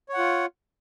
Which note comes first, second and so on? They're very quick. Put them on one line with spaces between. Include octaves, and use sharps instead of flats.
C#5 F#5 F4